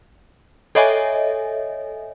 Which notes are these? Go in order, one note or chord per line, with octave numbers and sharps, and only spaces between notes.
A4 C#5 D#5 E5 G#5